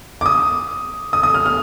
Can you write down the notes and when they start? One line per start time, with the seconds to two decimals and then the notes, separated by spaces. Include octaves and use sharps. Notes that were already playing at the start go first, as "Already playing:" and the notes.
0.21 D6
0.26 D#6
1.13 D#6
1.23 D#6
1.34 F6
1.46 F6